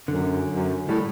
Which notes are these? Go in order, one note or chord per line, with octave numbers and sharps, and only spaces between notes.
F#2 D3
F#2
A2 G3